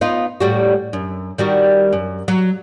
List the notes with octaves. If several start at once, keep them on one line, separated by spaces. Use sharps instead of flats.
B3 D#4 F4
A2 G3 F#4
F#2
D#3 G3 F#4
F#2
F#3